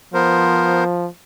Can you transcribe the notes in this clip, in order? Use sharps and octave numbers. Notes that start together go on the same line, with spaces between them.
F3 B3 A#4 C5